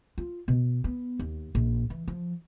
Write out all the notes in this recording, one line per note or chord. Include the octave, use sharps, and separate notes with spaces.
F4
B2
B3
D#2
A#1
E3
F3